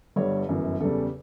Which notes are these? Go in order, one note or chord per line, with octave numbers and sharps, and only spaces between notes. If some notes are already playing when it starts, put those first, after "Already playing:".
G1 G2 D3 G3 C#5
G1 F#2 E3
E2 C#3 G3 A4